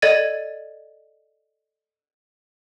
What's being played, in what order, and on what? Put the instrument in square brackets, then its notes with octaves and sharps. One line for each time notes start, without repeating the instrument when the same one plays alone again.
[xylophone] A4 D5 D#5 G#6 A6 D#7